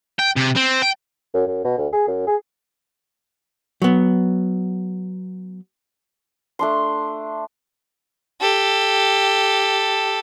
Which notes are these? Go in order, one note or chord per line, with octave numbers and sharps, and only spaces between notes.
G5
C3
C4
G5
F#2
F#2
B2
D2
G#4
F#2
G#4
F#3 B3
A3 D4 C6
G4 A4